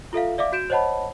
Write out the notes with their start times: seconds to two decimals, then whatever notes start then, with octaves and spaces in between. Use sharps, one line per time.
0.13 F4 A4 E5 F5
0.38 D5 E5 F5 D6
0.52 F#4 G6 D7 E7
0.70 C5 C#5 D#5 F#5 A5 B5